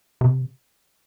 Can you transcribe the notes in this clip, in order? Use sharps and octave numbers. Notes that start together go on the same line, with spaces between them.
C3